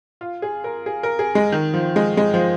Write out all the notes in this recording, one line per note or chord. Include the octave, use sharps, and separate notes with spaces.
F4
G#4
A#4
G#4
A#4
G#4
G#3
D#3
F3
G#3
G#3
F3